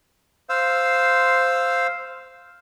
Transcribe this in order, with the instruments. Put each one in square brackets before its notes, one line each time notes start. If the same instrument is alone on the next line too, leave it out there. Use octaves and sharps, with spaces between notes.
[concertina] C5 F5 E6